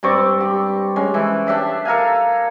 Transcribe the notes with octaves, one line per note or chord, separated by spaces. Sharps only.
G2 C4 D5 C#6
G4
G#3 C#4
E3 A4
D4 G4 E5 A5
A4 A#4 F5 G#5